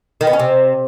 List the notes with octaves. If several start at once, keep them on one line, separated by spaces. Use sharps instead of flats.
D#3
B3
C#4
C3